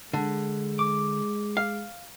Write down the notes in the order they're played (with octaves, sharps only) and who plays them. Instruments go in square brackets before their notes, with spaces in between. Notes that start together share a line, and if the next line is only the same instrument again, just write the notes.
[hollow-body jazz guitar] D3 [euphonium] G#3
[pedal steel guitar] D6
[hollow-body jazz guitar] F5